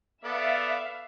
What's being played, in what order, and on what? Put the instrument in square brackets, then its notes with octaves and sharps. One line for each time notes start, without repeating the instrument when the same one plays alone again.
[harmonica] B3 A4 D5 [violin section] E5 F5